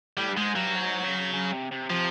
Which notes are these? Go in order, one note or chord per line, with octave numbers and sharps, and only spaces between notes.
A2 G3
G2
G#2 G#3
G2 F#3
G#2
C#3
C#3
C3
C3
C3 F3